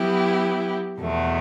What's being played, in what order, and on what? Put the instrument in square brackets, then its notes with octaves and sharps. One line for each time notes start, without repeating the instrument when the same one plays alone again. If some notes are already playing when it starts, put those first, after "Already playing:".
Already playing: [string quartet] F#3 B3 E4 G4
E2 B2 F#3 A3